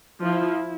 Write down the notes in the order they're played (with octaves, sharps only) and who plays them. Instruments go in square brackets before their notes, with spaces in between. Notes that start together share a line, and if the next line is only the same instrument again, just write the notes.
[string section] F3 [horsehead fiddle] E4